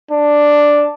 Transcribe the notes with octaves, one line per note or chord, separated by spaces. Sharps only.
D4